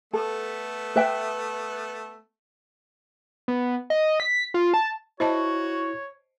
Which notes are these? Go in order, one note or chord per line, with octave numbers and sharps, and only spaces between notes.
A3 B3 A4
B4 E5 G5
B3
D#5
B6
F4
A5
E4 F#4 C5 C#5 D#5 A5